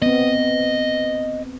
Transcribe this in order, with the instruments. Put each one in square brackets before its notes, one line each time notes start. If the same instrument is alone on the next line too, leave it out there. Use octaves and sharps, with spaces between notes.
[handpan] B3 C4 [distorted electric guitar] D#5